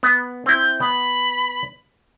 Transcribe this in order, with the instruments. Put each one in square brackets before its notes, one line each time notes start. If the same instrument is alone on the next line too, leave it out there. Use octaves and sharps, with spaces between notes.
[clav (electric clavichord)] B3
[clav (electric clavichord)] C4 E4 [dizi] G6
[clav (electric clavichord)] B3 [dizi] B5